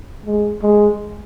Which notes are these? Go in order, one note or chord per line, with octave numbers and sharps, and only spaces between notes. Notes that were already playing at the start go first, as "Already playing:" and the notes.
G#3
G#3